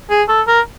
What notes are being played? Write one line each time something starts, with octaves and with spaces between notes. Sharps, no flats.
G#4
A4
A#4